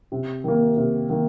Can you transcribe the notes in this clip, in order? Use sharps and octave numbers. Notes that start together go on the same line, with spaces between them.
C3
D#3 A#3
C3
D#3 A#3